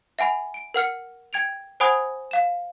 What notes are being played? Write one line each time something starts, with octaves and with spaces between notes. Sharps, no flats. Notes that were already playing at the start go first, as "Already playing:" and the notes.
E5 F#5 G#5 B5
D7
A#4 F#5 F6 C#7
G5 G#6 D7 F7
C5 F#5 G#5 B5 D#6 G#6
F5 E7